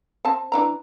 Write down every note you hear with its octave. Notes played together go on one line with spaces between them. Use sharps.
C4 A5
E3 D4 A#5